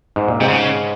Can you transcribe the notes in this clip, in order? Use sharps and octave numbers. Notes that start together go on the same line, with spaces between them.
G#2
A#2
G#2 C3
C#3